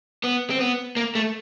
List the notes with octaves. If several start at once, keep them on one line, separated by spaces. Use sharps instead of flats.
B3
C4
B3
A#3
A3